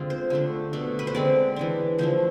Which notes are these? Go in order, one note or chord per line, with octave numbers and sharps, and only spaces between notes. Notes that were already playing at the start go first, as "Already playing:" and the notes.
Already playing: D3 G#3 C4 F4
C5
D3 A3 D4
B2 A3 D4
B4
C5
D3 G#3 C4 D5
E3 G#3 D4
D3 F3 A3 D4 C5